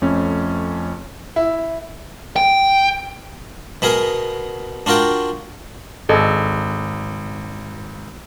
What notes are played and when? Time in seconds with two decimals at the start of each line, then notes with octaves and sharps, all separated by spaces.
0.02 F2 A3 C#4
1.36 E4
2.36 G5
3.82 B2 B3 G#4 A#4
4.86 D4 F4 F#4 A#4 G5
6.09 G#1 G#4 A4 D#5